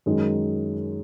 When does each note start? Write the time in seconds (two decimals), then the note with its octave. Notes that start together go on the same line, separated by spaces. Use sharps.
0.06 F#2 D#3 G#3